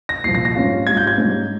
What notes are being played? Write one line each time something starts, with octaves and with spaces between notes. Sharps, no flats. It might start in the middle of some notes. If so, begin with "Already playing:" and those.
A#6
C2 A#2 F3 C7
A#6
A#6
G#2 G3 C#4 F4
G#2 G3 C#4 F4 G#6
G6
G#6
G#2 G3 C#4 F4